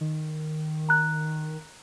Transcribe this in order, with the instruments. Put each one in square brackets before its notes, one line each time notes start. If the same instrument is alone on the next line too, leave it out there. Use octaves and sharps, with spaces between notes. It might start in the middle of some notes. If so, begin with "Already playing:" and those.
[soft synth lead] D#3
[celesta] A#5 F#6